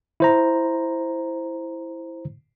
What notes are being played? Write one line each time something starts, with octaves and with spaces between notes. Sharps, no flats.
E4 C5 A#5